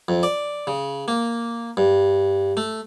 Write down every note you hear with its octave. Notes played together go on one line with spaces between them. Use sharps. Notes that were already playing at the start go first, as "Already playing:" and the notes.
F2
D5
C#3
A#3
G2
A3